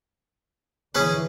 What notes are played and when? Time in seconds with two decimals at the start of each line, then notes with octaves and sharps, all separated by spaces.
0.95 D3 E3 C#4 G#4 B4